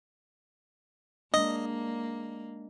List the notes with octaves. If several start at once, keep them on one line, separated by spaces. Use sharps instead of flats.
G#3 A#3 D4 D#5